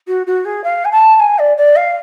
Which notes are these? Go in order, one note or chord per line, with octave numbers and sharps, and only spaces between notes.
F#4
F#4
G#4
F5
G#5
A5
G#5
D5
D5
F5